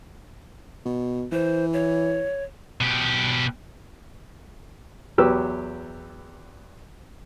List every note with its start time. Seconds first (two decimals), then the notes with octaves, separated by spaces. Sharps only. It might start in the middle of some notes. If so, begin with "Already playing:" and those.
0.85 B2
1.32 E3 C5
1.73 C#5
2.81 B2 G4
5.18 E2 F#3 G4 B4 E6